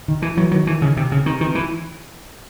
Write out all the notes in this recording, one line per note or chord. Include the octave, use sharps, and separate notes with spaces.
D#3
E3
E3 F#3
D#3 F#3
E3
C#3
C3
C#3
C3 D#3
D#3 E3
E3